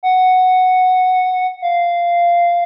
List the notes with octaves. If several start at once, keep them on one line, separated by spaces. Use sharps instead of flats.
F#5
F5